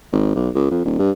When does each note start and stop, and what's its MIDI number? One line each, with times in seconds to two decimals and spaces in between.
0.12 0.33 32
0.35 0.49 35
0.55 0.67 37
0.71 0.85 41
0.85 0.96 27
0.99 1.11 43